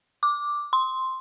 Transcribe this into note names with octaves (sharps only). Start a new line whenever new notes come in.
D6
C6